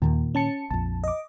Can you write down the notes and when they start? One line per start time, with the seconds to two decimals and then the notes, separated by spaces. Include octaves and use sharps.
0.02 D#2 A#2 D#3 A#3
0.35 C#4 A5 C#7
0.70 A#1 F2 A5
1.04 D#5 D6